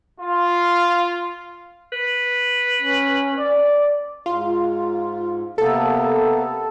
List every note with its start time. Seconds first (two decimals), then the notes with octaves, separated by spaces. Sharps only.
0.20 F4
1.92 B4
2.82 C#4
3.38 D5
4.26 G#2 F4
5.58 C3 A#3 B3 A4